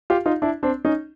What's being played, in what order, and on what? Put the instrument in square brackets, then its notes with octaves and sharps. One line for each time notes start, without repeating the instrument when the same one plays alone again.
[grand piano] F4 G4
D#4 F4
D4 E4
C4 D4
C#4 D#4